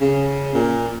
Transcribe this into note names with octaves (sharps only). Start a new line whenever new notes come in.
C#3
A#2